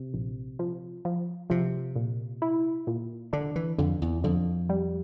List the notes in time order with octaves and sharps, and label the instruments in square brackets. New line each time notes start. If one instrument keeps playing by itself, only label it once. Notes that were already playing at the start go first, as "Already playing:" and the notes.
Already playing: [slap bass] C3
[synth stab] A#1
F3
F3
[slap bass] C3 [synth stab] F3
[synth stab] A#2
E4
A#2
[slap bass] D3 [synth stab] D4
[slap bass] E3
[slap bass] F2 [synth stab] D3
[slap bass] E2
[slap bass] F2 [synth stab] D3
[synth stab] G3